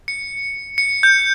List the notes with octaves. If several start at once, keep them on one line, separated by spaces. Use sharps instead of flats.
C#7
C#7
G6